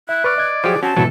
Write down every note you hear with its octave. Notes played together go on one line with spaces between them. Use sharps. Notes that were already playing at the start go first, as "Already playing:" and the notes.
E4 E5 F#6
B4 D5 C#6 F6
D#5 G#6
F3 F#3 G4 G#4
C4 C#4 F#4 A5
G#2 B2 E3 F#3 E4 A4